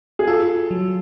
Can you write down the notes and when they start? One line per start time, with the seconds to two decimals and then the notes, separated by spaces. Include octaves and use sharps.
0.19 G#4
0.27 F4 A4
0.71 F#3